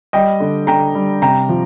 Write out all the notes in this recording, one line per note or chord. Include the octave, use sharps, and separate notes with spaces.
G3 D#5 G5
D3
D3 G5 A#5
G3
C3 G5 A#5
F3